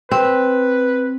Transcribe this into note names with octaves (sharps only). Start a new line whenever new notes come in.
C4 B4